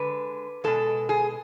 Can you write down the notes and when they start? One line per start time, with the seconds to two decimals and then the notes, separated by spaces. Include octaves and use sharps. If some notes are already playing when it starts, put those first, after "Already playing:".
Already playing: D3 G#3 B4
0.64 B2 G#3 A4
1.09 G#4